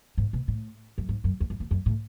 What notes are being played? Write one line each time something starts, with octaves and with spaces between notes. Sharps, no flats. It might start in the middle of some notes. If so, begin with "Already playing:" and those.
G#2
B2
A2
F#2
G#2
F#2
E2
F#2
E2
F#2
A2